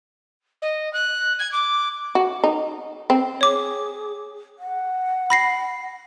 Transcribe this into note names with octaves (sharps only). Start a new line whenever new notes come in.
D#5
F#6
G#6
D6
F#4
D#4
C4
G#4 C#5 D6
F#5
B5 A#6 C7